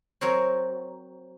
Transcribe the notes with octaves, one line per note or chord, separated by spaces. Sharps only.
F#3 C4 A#4 C5 C#5